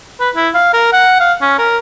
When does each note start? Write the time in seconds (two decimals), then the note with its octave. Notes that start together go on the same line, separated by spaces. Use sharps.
0.20 B4
0.36 E4
0.54 F5
0.73 A#4
0.93 F#5
1.20 F5
1.42 C#4
1.58 A#4